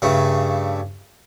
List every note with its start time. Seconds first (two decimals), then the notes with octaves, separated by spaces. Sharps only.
0.02 G2 C#3 A3